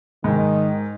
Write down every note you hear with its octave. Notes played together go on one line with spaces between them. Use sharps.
G#2 D#3